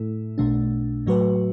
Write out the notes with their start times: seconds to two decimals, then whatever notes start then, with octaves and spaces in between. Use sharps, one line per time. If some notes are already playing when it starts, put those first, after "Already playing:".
Already playing: A2 A3 E4 A4
0.38 B1 B2 A3 D4
1.06 A2 F#3 A3 F#4 B4